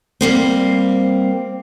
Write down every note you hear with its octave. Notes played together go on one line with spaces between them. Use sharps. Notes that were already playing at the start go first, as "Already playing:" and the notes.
G3 A#3 C4